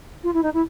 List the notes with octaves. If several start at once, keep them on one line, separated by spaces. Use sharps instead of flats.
F4
E4
D#4
E4